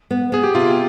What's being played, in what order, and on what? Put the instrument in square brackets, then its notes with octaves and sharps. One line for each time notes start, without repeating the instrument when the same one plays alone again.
[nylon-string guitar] B3
[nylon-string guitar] B3 [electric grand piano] G#4
[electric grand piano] G4
[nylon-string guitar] C3 [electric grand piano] F4